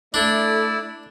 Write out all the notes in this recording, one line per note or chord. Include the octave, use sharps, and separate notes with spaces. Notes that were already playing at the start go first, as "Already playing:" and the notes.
A3 D4 E4 D5